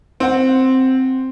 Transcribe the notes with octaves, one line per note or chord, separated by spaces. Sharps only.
C4 F#5